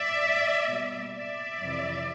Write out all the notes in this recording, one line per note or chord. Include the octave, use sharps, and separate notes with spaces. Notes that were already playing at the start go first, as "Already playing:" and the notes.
Already playing: D5 E5
B2 G3 A#3
D5 E5
F2 C3 E3